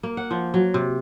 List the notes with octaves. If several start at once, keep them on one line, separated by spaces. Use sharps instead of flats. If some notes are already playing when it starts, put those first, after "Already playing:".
A#3
F#5
F3
F#3
C3